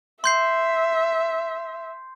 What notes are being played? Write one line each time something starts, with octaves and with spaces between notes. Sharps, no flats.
E5 C6 G6 C7